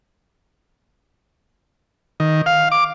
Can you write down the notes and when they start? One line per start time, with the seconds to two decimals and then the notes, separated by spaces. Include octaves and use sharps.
2.20 D#3
2.46 F5
2.72 D6